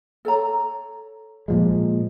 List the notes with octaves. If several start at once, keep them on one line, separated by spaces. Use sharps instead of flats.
A4 C#5 A#5
A#2 F3 G#3